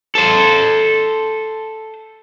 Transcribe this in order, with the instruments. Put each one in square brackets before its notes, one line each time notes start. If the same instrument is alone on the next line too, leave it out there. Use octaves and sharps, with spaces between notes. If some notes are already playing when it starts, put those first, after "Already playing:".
[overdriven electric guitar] A4 C5